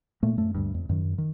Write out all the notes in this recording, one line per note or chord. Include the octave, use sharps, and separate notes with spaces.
A#2 A3 A#3
F#2 A3
D2 G2
F2
F#2 D#3
D#3